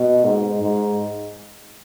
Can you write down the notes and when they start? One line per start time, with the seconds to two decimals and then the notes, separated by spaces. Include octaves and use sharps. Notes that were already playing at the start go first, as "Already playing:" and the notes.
Already playing: B2
0.24 G#2
0.61 G#2